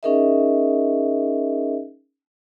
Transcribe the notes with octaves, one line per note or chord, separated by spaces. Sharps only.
C#4 D#4 G#4 A#4 D#5 E5